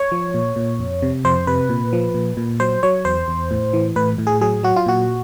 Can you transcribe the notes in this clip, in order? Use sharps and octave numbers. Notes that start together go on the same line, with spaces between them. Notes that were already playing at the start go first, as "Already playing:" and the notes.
Already playing: C#5
F3
A#2
A#2
F2
C3
F2 C5
C3 B4
A#2
F3
A#2
A#2
F#3 C5
F#3 C#5
E2 C5
E2
A2
E3
A2 B4
A2
G#4
F#3 G#4
F#3 F#4
F4
A#2 F#4